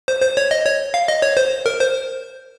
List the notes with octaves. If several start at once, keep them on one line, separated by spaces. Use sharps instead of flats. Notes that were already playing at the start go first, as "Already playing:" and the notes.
C5
C5
C#5
D#5
C#5
F5
D#5
C#5
C5
A#4
C5